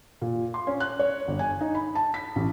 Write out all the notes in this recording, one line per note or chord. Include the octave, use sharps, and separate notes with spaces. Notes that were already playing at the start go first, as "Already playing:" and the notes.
A#2
C6
C#4
F#6
C#5
G1
G#5
D#4
B5
A5
B6
A1